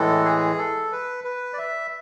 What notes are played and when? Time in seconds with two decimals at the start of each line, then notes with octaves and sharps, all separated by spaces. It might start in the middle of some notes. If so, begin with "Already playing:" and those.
Already playing: A2 E3 G#3 A4
0.25 G#4
0.58 A4
0.92 B4
1.24 B4
1.53 D5
1.58 E5